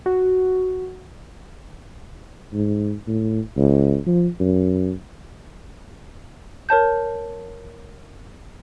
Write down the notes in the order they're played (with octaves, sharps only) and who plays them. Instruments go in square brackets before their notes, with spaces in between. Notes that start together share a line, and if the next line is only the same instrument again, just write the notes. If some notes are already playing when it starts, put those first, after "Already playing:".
[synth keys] F#4
[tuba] G#2
A2
C#2
F3
F#2
[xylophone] A#4 C#5 A5 G6